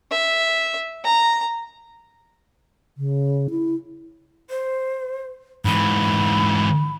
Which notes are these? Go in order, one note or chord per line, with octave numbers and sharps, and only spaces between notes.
E5
A#5
C#3
E4
C5
G#2 E3 B5